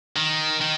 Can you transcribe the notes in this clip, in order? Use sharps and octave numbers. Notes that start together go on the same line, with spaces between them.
D#3
D#3